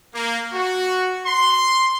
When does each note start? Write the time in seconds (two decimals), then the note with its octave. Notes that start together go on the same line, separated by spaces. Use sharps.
0.15 A#3
0.52 F#4
1.26 C6